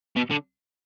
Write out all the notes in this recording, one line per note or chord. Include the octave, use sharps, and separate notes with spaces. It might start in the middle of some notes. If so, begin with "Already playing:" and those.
B2
D3